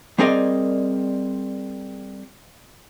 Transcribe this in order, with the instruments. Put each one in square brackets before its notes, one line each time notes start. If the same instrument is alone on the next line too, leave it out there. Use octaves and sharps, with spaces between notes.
[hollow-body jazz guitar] G3 C4 G#4 A#4 D5 D#5